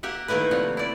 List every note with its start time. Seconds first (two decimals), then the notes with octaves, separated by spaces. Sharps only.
0.03 A#3 G4 E5 F#5
0.28 D#3 A3 A#3 E4 B4
0.51 C3 F3 G3 F#5
0.77 E4 D5